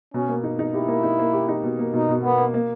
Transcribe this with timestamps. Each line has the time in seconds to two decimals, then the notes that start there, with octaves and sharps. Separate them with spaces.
0.14 B2 C#4
0.28 A#3
0.44 D#4
0.59 D#4
0.74 E4 G4
0.88 A#3
1.04 D#4
1.19 A#3
1.33 G4
1.48 D#4
1.64 B2
1.79 A#3
1.93 B2 D#4
2.09 B2
2.24 A#3 B3
2.38 A#3
2.54 A#3